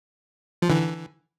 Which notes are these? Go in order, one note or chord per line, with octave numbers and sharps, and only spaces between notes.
F3
D3 E3